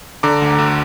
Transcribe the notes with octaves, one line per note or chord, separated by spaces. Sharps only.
D3 A#5 D6
D2
D2